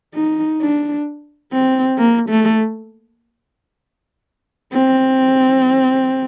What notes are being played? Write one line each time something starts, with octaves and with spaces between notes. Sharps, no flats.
D#4
D4
C4
A#3
A3
C4